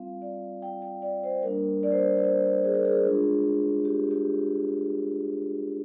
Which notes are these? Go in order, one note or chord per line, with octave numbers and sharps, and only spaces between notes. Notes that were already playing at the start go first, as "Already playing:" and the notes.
Already playing: G3 C4 F4 F5
D5
G5
G5
D5
C5
G3 A#3 D4 A#4
D5
C5
D5
D5
C5
G#4
A#4
G#4
G#3 D4 F4
G4
G4